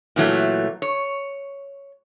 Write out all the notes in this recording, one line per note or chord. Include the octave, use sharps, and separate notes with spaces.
A#2 E3 F#3 A3
C#5